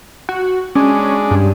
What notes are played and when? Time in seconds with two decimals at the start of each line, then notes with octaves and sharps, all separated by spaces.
0.29 F#4
0.75 G#3 C#4 D4
1.31 G2